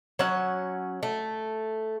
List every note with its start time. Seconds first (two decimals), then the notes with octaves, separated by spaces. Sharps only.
0.19 F#3 C#4 F#5
1.03 A3